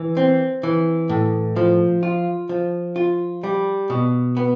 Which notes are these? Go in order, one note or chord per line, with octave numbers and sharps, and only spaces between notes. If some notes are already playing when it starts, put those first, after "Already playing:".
Already playing: E3
C4
E3
A2
F3
F4
F3
F4
G3
B2
B3